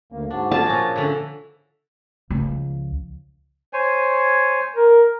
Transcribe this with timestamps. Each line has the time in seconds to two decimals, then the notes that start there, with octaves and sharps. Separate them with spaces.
0.12 D2 A#3
0.30 G#2 F#3 D4
0.51 F4 G#4 A5
0.66 A#2 F3 C#4 F#4
0.96 D3 E3
2.30 C#2 F3
3.73 C5 C#5 G#5
4.76 A#4